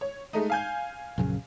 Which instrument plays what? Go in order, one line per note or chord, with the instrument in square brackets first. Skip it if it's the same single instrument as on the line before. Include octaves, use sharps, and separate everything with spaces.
[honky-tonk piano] C#5
G#3 A3 D#4
F5 G#5 G6
[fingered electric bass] A#1 F#2 C#3